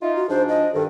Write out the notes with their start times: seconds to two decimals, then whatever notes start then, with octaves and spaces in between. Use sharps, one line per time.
0.02 D#4 F4 E5
0.16 F#4
0.29 G#2 F3 D4 C5
0.49 D#5
0.74 G2 D#3 A4